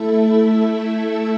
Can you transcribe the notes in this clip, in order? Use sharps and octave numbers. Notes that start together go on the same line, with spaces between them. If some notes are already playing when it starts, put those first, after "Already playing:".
Already playing: A3 E4 A4 E5